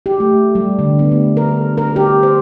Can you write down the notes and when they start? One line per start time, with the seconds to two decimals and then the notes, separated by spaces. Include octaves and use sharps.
0.06 G4
0.20 A3
0.55 G3
0.79 D3
0.99 B3
1.11 A3
1.37 A#4
1.77 A#4
1.96 G4
2.23 C5